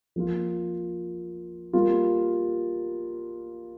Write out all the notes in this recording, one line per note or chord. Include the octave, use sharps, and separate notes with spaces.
F3 A#3 F4
G3 A#3 F4